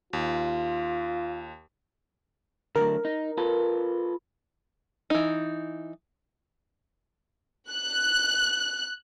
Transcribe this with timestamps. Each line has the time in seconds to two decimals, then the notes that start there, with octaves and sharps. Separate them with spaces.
0.13 D#2 F4
2.76 D3 F#3 A3 A#4
3.05 D#4
3.38 F4 A4 B4
5.10 E3 D#4
7.71 F#6